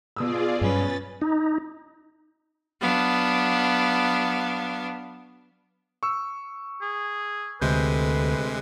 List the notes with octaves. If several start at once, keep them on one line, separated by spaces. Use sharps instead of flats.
B2 F4 G#4 D5 D#6 E6
G2 F#3 C#4 B4 A6
D#4
F#3 B3 D4 F5
C#6 E6
G#4
D2 C3 G#3 B4 G6